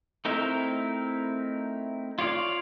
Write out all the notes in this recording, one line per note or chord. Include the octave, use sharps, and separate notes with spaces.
A3 C4 D#4 E4 A#4
F4 C#5 D5 F5